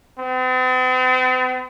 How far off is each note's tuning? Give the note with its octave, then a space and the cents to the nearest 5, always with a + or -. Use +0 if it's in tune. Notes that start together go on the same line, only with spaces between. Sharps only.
C4 -45